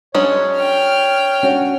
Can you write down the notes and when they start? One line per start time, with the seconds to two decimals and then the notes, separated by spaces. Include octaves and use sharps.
0.15 F#3 G#3 C#4 D4 C#5
0.57 G5 F6
1.43 C#4 D4 F#4